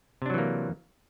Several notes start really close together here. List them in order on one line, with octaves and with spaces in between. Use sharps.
C3 D4 F#3 E3 A#3